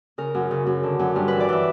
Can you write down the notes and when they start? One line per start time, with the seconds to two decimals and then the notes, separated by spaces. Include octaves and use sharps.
0.18 C#3 A#4
0.35 F#2
0.51 C#3
0.67 F#2
0.83 D3
0.99 F#2
1.15 G2 A#4
1.28 E3 B4
1.40 D5
1.49 E3 E5